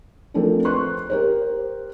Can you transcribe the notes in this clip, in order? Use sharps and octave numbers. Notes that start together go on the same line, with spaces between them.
F3 A3 C4 D4 A4 A#4
B4 C6 C#6 F#6
G4 A#4 C5